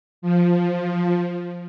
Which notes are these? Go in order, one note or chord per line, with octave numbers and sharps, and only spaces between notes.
F3